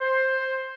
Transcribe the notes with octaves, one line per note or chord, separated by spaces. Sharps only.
C5